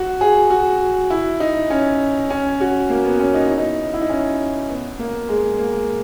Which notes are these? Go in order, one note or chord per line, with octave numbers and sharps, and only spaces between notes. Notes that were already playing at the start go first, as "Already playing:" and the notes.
Already playing: F#4
G#4
F#4
E4
D#4
C#4
C#4
F#4
A#3
B3
C#4
D#4
E4
D#4
E4
D#4
C#4
B3
A#3
G#3
A#3